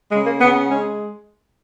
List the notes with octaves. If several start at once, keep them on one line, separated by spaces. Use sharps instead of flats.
C#3 G#3
A#3
C#3 B3
B3
G#3 C#4